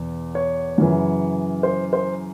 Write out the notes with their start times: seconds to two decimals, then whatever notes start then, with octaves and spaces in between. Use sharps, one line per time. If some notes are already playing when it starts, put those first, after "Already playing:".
Already playing: E2 B2
0.35 C#5
0.78 F#2 C#3 E3
1.63 C5
1.93 C5